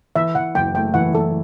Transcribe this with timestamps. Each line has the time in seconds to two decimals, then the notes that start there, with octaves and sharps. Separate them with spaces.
0.16 E3 E5
0.35 E3 F#5
0.55 F#1 G5
0.75 A3 G5
0.94 E3 F#5
1.13 E3 A4